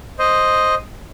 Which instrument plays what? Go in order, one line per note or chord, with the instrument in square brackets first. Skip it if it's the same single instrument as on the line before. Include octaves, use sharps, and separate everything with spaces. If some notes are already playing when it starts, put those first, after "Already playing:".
[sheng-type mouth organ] C5 D#5